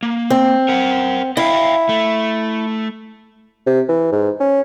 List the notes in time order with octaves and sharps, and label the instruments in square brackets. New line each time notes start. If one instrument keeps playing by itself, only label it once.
[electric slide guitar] A#3
[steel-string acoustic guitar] C4
[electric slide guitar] A#4 F#5
[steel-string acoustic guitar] E4 [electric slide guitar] D#5 F5 G5
[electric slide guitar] A3
[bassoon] C3
E3
G#2
C#4